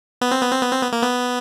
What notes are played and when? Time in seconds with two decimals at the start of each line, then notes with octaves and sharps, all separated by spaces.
0.21 B3
0.31 C4
0.41 B3
0.51 C4
0.62 B3
0.71 C4
0.81 B3
0.92 A#3
1.03 B3